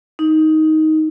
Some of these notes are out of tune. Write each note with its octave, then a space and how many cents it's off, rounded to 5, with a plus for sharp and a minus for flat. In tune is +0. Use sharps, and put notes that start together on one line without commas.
D#4 +10